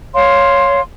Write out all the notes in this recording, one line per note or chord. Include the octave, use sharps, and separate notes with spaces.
C#5 F5 C6